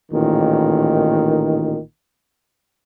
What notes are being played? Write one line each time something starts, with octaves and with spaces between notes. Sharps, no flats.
A1 A#2 D#3